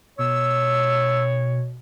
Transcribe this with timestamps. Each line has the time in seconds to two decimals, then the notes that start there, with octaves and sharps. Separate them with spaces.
0.19 B2 C#5 E6